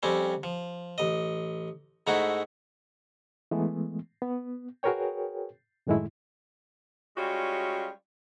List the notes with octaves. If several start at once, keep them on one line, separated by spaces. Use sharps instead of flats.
F2 G3 C4 C#4
F3
A1 D#5
G#2 A3 D#4 E4 F#4
E3 G#3 A3 B3
B3
F#4 G#4 A#4 B4 C#5 G5
F#2 A2 D#3 G#3 A3 E4
G3 G#3 C#4 F4 F#4